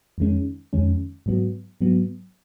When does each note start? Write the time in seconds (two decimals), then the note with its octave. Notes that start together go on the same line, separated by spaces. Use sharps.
0.18 F2 D#3 G#3 C#4
0.73 F2 D#3 G#3 C#4
1.26 G#2 F#3 B3
1.81 G#2 F#3 B3